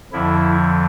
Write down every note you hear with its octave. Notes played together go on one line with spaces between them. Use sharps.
F2 D3 F3 E4